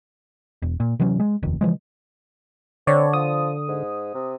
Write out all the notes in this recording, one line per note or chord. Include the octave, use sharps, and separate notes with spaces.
E1
A#2
C3 E3 F#3 C#4
G#3
F1 D#2
C#3 E3 F3 G#3
D3 C4 C#5 D5
F3 D#6
G#2
C3